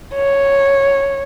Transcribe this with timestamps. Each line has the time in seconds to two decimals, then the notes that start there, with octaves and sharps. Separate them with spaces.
0.14 C#5